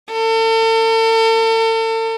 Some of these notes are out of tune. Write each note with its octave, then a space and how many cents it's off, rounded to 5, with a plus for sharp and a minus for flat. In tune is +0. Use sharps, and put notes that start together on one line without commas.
A4 +40